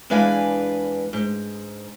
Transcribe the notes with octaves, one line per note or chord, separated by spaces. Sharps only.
E2 G#3 D4 B4 F5 G#5
G#2